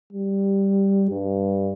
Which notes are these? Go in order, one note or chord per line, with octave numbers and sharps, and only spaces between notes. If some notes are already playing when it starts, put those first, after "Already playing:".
G3
G2